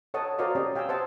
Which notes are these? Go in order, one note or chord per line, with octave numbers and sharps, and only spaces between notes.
A4 C#5 D#5 F#5 A5 D#6
F#4 A#4 C5 D5 D#5 F5
C#4 G4 C#5 D#5
F5 G5 G#5 D#6 E6
C5 D#5 F#5 A5